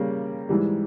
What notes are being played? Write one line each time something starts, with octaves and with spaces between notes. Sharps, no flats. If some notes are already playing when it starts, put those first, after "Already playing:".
Already playing: C#3 G3 A#3
G#2 E3 G3